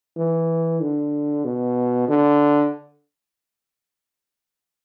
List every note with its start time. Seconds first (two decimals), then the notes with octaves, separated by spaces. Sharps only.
0.17 E3
0.81 D3
1.45 B2
2.09 D3